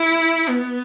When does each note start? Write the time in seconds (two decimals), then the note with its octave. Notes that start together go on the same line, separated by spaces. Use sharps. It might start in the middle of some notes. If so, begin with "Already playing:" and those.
Already playing: E4
0.49 B3